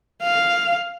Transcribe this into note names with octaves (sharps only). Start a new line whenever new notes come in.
F5